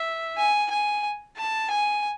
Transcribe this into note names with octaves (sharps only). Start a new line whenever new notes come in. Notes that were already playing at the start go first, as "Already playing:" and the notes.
Already playing: E5
G#5
G#5
A5
G#5